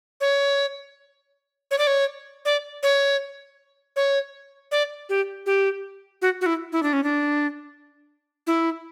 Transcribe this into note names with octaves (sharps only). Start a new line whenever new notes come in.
C#5
C#5
D5
C#5
D5
C#5
C#5
D5
G4
G4
F#4
F#4
E4
E4
D4
C#4
D4
E4